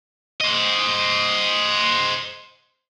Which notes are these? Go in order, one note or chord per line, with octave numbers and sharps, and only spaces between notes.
C5 D#5